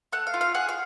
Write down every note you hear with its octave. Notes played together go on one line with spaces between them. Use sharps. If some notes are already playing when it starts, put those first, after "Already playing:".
A3 F#5
F5
F4
F5
G#4 F#5
F5